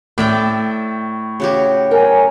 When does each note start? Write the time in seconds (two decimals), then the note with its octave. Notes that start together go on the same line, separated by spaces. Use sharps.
0.18 A2 D5 E5 G5
1.40 C#3 F#4 G4
1.91 A#4 C#5 G5 G#5 A#5